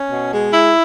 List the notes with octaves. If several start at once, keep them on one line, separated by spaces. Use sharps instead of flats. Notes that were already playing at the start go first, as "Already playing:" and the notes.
Already playing: C#4
B2
G#3
E4